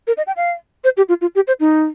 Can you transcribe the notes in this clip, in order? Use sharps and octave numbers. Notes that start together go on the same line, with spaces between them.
A#4
D#5
G5
F5
C5
G4
F4
F4
G4
C5
D#4